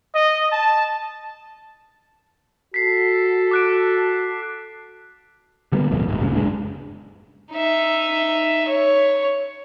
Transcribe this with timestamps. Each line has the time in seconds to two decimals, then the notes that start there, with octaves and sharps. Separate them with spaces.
0.15 D#5
0.51 A5
2.74 F#4 A4 B6 C7
3.51 D6 F#6 D7
5.72 D3 G3 A#3 B3
5.91 D1 F2 B2
6.08 D1 G#2
6.21 G2 A#2 C#3
6.35 F#1 G#3 D4
7.53 D#4 E5
8.68 C#5